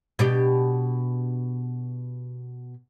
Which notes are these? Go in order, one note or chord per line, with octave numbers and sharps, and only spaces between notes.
B2 D4 G4